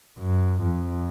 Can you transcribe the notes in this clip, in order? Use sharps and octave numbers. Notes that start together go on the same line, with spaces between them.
F#2
F2